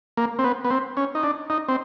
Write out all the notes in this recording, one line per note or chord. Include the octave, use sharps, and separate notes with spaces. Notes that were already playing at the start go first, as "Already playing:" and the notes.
A#3
C4
B3
B3
C4
C#4
D#4
D4
D#4
C4